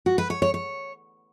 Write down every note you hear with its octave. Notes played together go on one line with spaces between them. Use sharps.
F#4
B4
C#5
C#5
C#5